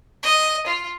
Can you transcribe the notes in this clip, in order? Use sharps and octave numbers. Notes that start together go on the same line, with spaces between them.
D#5
F4